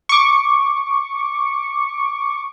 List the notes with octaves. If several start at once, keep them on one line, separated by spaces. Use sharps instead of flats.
C#6 D6